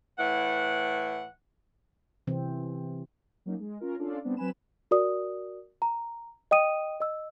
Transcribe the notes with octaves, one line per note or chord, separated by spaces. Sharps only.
A2 E3 F#5
C3 E3 C4
F#3 A#3 C#4 D#4
G#3
C#4 F4 A#4
C#4 D4 F4 A4 D5 F5
G3 B3 C4 D4
F#3 C4 B4 G#5 B5 E7
F#4 A#4 D5 D#6
A#5
D#5 G5 D#6 D#7
D#5 E6